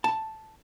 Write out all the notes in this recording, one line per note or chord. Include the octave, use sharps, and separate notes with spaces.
A5